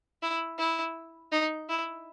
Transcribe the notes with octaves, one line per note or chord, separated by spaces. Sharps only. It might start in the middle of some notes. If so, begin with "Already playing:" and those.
E4
E4
D#4
E4